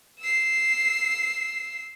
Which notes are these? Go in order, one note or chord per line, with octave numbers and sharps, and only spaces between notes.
E6 C7